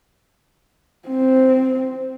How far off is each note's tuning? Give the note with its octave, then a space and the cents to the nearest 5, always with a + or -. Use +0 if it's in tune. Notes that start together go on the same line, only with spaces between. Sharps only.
C4 -5